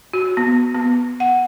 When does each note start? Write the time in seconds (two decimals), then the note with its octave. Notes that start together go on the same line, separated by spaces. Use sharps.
0.13 F#4
0.37 B3
0.75 B3
1.20 F#5